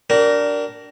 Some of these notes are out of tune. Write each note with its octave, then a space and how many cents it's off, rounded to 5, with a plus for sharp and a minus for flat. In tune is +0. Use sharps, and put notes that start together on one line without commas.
D4 -5 G4 -45 A#4 +0